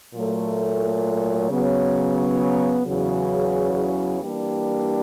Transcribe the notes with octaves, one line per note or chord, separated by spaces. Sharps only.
A#2 F#3 A3
C#3 F#3 B3
E2 C#3 F#3
E3 G3 A#3 D4 G4